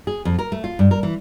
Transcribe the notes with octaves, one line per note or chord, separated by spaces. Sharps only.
G#4
F2
A#4
A3
F4
G2
A#4
E3